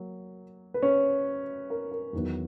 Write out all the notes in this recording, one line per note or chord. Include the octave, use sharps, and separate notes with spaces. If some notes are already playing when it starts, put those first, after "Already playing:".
Already playing: F#3 A#3
B4
C#4 C#5
A#4
A#4
E2 D#3 F#3 B3